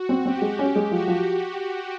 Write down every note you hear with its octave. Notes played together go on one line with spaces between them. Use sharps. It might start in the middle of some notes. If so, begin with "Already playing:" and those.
Already playing: F#4
C4
C4 G4
G#3
C#4 G4
G#3
F3 F#4
F3